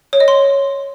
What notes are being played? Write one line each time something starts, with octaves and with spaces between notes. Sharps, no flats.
C#5
D#5
C6